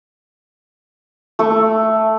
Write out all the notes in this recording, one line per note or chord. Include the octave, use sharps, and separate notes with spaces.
A3 C#6 D6